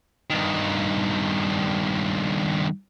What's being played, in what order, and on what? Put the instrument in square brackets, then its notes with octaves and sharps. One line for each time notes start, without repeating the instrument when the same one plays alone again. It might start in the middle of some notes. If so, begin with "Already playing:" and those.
[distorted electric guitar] G2 D#3